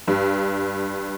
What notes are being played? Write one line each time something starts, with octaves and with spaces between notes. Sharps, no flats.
G2